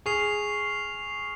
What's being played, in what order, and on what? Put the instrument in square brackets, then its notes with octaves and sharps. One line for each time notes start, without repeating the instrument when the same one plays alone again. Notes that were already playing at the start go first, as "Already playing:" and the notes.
[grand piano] G#4 [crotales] C#6 F6 C7 F7